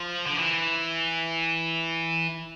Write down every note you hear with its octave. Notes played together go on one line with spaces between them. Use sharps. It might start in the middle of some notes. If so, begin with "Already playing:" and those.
Already playing: F3
D3
E3